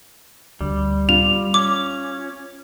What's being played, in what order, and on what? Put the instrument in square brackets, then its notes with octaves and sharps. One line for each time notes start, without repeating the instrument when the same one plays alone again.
[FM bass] D2 [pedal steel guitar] G3
[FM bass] F4 [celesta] F7
[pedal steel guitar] C#4 [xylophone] D6